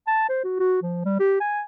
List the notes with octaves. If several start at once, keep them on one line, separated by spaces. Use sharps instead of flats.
A5
C5
F#4
F#4
F3
G3
G4
G#5